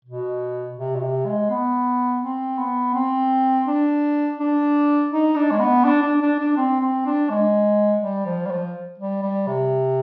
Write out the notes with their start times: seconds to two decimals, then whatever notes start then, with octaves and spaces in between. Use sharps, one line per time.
0.04 B2
0.77 C3
0.95 B2
1.01 C3
1.26 G#3
1.50 B3
2.22 C4
2.58 B3
2.94 C4
3.66 D4
4.39 D4
5.12 D#4
5.36 D4
5.51 G#3
5.60 B3
5.84 D4
6.02 D4
6.21 D4
6.39 D4
6.57 C4
6.81 C4
7.06 D4
7.29 G#3
8.01 G3
8.26 F3
8.46 G3
8.50 F3
8.99 G3
9.22 G3
9.47 C3